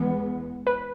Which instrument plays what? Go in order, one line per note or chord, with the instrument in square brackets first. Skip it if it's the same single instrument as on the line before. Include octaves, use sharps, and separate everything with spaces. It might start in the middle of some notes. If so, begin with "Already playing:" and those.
Already playing: [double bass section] E2 E3 G#3 B3 [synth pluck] G#4
[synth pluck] B4